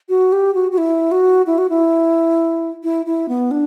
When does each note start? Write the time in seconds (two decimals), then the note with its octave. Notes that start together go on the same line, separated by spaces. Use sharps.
0.09 F#4
0.32 G4
0.55 F#4
0.72 F#4
0.78 E4
1.12 F#4
1.47 E4
1.58 F#4
1.70 E4
2.83 E4
3.06 E4
3.29 B3
3.51 D4